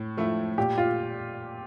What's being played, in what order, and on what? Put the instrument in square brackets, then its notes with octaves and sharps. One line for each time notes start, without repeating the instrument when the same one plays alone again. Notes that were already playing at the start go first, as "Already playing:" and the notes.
Already playing: [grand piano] A2
F3 A3 E4
[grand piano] A#2 [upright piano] G4
[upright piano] F4